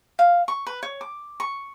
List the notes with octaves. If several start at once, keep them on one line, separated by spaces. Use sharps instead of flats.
F5
C#6
B4
C#5
D6
C#6